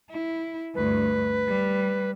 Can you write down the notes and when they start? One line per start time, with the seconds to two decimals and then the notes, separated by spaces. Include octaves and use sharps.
0.10 E4
0.75 D2 G2 B4
1.48 G3